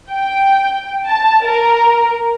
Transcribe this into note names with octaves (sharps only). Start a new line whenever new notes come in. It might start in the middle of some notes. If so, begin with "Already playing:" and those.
G5
A5
A#4